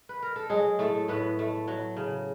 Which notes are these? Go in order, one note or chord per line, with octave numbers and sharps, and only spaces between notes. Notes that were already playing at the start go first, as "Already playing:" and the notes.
B4
A#4
A4
F#3 G#3 G#4
A2 A3 A4
A2 B3 B4
A3
F#3
C#3